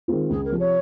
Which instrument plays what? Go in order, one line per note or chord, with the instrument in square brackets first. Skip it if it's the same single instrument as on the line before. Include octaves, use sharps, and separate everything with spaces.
[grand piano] D#3 G#3 C4 F4
[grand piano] C#2 [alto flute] G#4
[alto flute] A#4
[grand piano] C3 F3
[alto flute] C#5